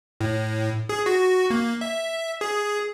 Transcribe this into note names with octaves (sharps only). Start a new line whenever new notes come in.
A2
G#4
F#4
A#3
E5
G#4